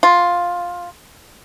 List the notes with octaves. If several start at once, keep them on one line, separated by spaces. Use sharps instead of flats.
F4